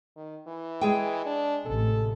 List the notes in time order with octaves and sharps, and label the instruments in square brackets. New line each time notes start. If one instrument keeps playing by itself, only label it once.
[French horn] D#3
E3
[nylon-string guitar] G#3 G#4 G5
[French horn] D4
[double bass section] A1 C3 [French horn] A4